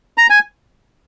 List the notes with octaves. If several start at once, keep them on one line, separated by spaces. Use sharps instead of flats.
A#5
G#5